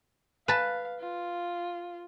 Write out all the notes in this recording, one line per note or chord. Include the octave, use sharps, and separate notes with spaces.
B4 F5 A5
F4